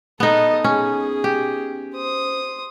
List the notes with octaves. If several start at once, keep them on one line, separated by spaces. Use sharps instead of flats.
B3 D#4 A4 D#5
C#4 G#4
G4
C5 D#6